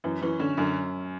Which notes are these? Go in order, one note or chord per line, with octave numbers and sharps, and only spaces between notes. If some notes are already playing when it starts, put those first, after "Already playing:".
F#2 E3
E3 C#4
D3 C#4
F#2 D3